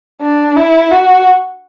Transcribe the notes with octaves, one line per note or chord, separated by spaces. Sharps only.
D4
E4
F#4